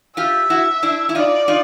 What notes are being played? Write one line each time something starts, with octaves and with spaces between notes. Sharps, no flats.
F4 G4 E5
E4 F#4
D4 E4
E4
D#4 F4 D5
D#4 F4